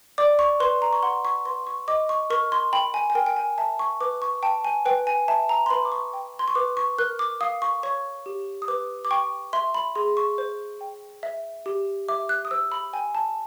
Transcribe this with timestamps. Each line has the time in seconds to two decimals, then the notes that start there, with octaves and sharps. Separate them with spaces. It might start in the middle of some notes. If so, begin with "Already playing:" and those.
0.18 D5 D6
0.39 C#6
0.60 B4 C6
0.82 A#5
0.93 C#6
1.03 F#5 C6
1.25 C#6
1.45 B4 C6
1.67 C#6
1.88 D#5 D6
2.09 C#6
2.30 A#4 C#6
2.52 C6
2.73 G5 B5
2.94 G#5
3.10 G#5
3.15 A#4 G5
3.26 G5
3.36 G#5
3.58 E5 A5
3.79 C#6
4.01 B4 D6
4.22 C#6
4.43 G5 A5
4.65 G#5
4.85 B4 G5
5.07 G#5
5.28 E5 A5
5.49 A#5
5.66 C6
5.70 B4 B5
5.85 D6
5.92 C#6
6.13 G5
6.39 C6
6.48 C#6
6.55 B4 D6
6.77 C#6
6.98 A#4 F#6
7.19 D6
7.41 F5 D#6
7.62 C#6
7.83 C#5 C#6
8.26 G4
8.62 D#6
8.68 B4 D6
9.05 D6
9.11 G5 C#6
9.53 E5 C6
9.74 B5
9.95 G#4 C6
10.17 C#6
10.38 C5
10.81 G5
11.23 E5
11.66 G4
12.08 E5 D6
12.29 F#6
12.45 D#6
12.51 C5 E6
12.72 B5
12.93 G5 G#5
13.15 A5